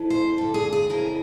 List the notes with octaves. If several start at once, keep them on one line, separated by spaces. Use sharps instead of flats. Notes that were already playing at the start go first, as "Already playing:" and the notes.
Already playing: F2 E3
C5
G2 D3 A4
G#4
G#4
F2 C#3 E3 A#4